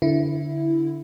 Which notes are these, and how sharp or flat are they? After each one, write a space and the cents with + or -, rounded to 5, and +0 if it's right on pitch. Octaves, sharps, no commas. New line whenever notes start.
D3 -10 E4 +0